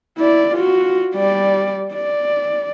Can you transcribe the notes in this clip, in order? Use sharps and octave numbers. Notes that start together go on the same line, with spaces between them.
E4 D5
F4 F#4
G3 D5
D5